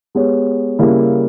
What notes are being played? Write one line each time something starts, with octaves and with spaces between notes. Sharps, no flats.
G#3 B3 G4 C#5
C#3 G3 A#3 E4